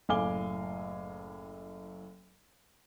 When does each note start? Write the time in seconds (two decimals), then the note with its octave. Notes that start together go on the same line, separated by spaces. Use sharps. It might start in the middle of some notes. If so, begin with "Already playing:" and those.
0.09 F#1 A2 F5 G#5 D6 G7